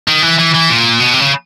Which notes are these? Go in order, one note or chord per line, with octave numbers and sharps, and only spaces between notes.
D#3
E3
E3
E3
A#2
B2
C3
C#3